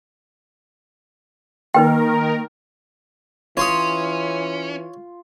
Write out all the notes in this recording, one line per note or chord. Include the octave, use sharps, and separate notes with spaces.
D#3 A#3 D#4 A#4 B4 G5
E3 C#4 F4 C#5 C6 D#6